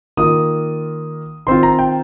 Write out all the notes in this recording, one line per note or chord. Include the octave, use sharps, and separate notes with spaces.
D#3 A#3 F4 D#6
D#3 C4 F4 C6
A#5
G5